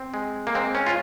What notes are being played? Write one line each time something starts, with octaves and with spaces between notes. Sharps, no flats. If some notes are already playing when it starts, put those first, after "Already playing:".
Already playing: C4
G#3
A#3
G#3 C4
C#4
F4